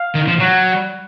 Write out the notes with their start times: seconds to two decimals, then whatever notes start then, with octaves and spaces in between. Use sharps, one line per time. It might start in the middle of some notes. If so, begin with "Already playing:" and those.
Already playing: F5
0.15 D#3
0.28 F3
0.40 F#3 F#5